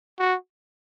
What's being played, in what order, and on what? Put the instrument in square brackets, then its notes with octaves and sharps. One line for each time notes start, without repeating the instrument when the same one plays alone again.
[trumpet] F#4